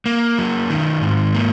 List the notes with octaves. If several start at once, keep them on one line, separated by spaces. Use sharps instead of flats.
A#3
F#3
D#3
G#2
A#3